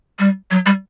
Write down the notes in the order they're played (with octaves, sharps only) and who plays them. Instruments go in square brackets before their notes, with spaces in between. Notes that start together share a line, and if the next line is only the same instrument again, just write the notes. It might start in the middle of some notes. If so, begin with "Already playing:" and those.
[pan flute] G3
F#3
G3